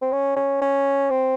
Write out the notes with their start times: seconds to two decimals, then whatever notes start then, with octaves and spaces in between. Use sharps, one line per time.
0.02 C4
0.13 C#4
0.36 C#4
0.61 C#4
1.11 C4